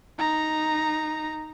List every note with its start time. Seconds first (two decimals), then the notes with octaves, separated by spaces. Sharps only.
0.19 D#4 A#5